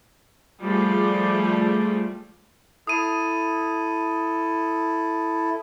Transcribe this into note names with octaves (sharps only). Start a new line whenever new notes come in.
F3 G3 A3 G#4 D5
E4 A4 D#6 D#7